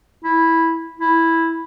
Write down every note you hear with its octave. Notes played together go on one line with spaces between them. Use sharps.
E4
E4